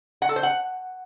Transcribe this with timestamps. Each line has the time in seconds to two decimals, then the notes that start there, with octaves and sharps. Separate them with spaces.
0.22 F#5
0.29 A4
0.36 C5
0.43 F#5